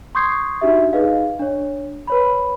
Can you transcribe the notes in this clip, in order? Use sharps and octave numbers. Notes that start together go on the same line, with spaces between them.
C6 C#6 D#6 G6 G#6 C7
D4 D#4 F#4 G4 E5
D#4 G#4 B4 D#5 F5
D4 C#5
B4 C#5 B5